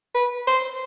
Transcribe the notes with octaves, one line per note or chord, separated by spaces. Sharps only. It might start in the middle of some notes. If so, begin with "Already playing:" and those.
B4
C5